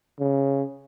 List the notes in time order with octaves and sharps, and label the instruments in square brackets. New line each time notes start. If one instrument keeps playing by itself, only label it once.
[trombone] C#3